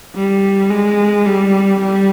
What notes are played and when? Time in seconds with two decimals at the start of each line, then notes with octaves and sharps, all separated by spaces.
0.15 G3
0.70 G#3
1.26 G3
1.81 G3